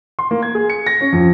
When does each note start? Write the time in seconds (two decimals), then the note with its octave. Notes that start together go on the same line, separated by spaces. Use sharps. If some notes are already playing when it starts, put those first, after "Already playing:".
0.19 C6
0.31 A#3
0.42 G#6
0.55 G#4
0.70 C#7
0.86 A#6
1.01 C#4
1.12 F2